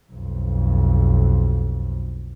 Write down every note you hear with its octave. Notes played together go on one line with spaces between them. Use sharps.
B1 F2